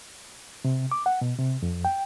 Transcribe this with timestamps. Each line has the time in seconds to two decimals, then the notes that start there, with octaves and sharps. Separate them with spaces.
0.65 C3
0.91 D6
1.06 F#5
1.21 B2
1.39 C3
1.62 F2
1.85 G5